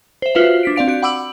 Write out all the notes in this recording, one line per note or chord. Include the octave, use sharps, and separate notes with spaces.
C5 E5
F4 F#4 B4 C5 E5 F5
D4 B6 D7
C4 D5 F5 D7
F#4 G6 D7
F#5 B5 D6 E6 D7 F#7